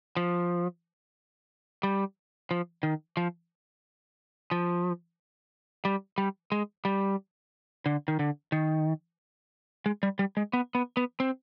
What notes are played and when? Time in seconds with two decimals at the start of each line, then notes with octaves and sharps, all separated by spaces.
0.17 F3
1.83 G3
2.51 F3
2.83 D#3
3.17 F3
4.51 F3
5.85 G3
6.18 G3
6.52 G#3
6.85 G3
7.86 D3
8.08 D#3
8.19 D3
8.52 D#3
9.86 G#3
10.03 G3
10.19 G3
10.37 G#3
10.53 B3
10.75 B3
10.97 B3
11.20 C4